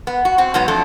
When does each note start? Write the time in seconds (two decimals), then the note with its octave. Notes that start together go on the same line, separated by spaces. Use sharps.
0.07 B3
0.25 F#4
0.38 C4 F#4
0.54 G#2 F#3 B3
0.68 F2 A3 D4